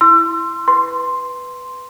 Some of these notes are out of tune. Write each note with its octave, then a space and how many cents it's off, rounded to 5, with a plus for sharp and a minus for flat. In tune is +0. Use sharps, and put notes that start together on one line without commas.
E4 +0 C6 +0 E6 +35
B4 +0 C6 +0